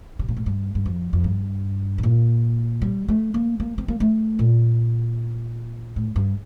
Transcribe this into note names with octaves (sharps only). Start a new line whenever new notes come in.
C3
A#2
A2
G2
G2
F2
F2
G2
C3
A#2
G3
A3
A#3
A#3
C4
A#3
A3
A#2
A2
G2